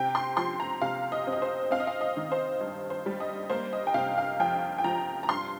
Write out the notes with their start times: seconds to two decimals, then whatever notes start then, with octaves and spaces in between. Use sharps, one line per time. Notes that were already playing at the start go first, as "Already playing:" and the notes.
Already playing: C3 G5
0.15 C6
0.37 F3 C6
0.60 A#5
0.82 C3 F5
1.12 D#5
1.27 C4
1.32 D#5
1.42 C5
1.71 C4 F5
1.80 D#5
1.87 F5
2.01 D#5
2.17 D#3
2.32 C5
2.61 G2
2.90 C5
3.06 G3
3.20 D#5
3.50 A#3 C5
3.73 D#5
3.87 G5
3.94 C3 F5
4.18 F5
4.40 F2 G5
4.78 G5
4.84 F3 A#5
5.23 A#5
5.28 G2 C6